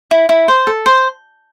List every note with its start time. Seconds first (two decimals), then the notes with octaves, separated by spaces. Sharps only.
0.11 E4
0.29 E4
0.48 C5
0.67 A4
0.86 C5